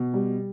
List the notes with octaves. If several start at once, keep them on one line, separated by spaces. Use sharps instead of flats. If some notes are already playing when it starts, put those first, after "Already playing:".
Already playing: B2
G3